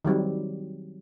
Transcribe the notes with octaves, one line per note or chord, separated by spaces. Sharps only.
D#3 F#3 G3 C4